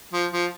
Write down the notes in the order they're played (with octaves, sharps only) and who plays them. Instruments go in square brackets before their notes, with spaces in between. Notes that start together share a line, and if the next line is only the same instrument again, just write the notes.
[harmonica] F3
F3